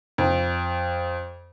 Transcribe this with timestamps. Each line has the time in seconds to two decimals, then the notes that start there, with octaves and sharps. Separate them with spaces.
0.18 F2